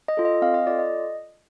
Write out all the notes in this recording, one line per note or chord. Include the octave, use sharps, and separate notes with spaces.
D#5
F4 A4
D#5
C4 F5
D#5
F4 A4 D5
D#5